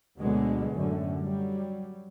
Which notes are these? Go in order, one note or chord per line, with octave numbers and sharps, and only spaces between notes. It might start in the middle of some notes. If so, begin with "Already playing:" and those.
D2 B2 D3 F#3 G#3 B3
F#2 A2 D3
F#3 G3